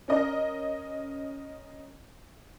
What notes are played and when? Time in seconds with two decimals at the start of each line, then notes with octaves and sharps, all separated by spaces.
0.08 C#4 A#4 D#5